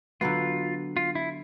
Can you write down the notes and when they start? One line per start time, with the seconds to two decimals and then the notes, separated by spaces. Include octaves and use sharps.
0.21 D3 F#3 B3 F4
0.97 F4
1.15 E4